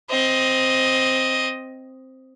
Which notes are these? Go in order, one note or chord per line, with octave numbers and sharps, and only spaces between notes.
C4 D#5